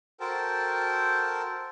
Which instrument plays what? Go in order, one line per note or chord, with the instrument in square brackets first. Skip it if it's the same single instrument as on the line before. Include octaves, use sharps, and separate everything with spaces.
[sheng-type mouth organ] F#4 A4 A#4 C5 G5 A5